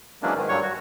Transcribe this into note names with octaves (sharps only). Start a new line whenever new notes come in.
E3 F#3 G#3 A#3 C#4 D4
G#2 D#3
G2 F#3 G3 C#5 C#6
F#4